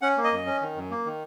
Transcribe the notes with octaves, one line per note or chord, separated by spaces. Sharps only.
C#4 F#5
A#3
D#5
F#2
C#4
D#3
F#2
A#3
D#3